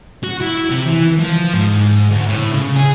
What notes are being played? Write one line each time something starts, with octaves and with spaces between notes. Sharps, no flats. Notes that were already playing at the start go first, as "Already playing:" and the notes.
F#4
E4
C3
E3
F3
G#2
D2
A2
C#3
G#4